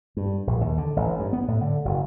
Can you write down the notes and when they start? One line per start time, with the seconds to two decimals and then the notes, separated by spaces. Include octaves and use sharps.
0.17 G2
0.47 A#1
0.61 D#2
0.77 D3
0.96 A1
1.19 G2
1.33 B3
1.48 A2
1.61 D3
1.85 F#1